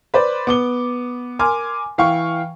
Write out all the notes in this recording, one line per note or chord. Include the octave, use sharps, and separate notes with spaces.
B4 C5 D5
B3 D6 G7
A#4 G#5 C6 D6 F6
E3 F5 G5 C#6